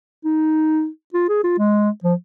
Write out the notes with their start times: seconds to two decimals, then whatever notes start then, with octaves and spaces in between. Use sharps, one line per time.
0.25 D#4
1.14 F4
1.29 G#4
1.44 F4
1.58 G#3
2.04 F3